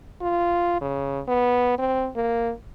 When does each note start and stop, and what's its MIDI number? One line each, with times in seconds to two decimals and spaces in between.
0.22 0.81 65
0.81 1.21 49
1.28 1.76 59
1.79 2.09 60
2.16 2.52 58